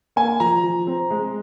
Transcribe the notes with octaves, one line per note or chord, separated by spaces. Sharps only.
A#3 G#5
F3 A#5
F3
C4
G#3